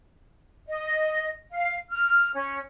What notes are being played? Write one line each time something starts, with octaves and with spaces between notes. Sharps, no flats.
D#5
F5
F6
C#4